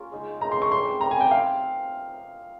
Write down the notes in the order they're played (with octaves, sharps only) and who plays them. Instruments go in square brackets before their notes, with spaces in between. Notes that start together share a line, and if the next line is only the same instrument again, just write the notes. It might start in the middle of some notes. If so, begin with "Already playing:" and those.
Already playing: [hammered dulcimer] A#3 C#4 F4 G#4 A#4
C#3 G#3 D#4
[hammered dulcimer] C#3 G#3 D#4 [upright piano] A#5
[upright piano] C6
C#6
[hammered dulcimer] C3 G3 C#4 G4 [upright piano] C6
[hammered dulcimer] C3 G3 C#4 G4 [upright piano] A#5
[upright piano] G#5
G5
[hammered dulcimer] F3 C4 G4 A#4 [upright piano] F5